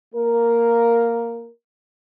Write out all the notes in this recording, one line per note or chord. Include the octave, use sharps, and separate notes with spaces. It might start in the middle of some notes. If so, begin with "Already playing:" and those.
A#3 A#4